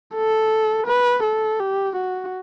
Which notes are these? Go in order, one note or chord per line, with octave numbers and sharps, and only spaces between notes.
A4
B4
A4
G4
F#4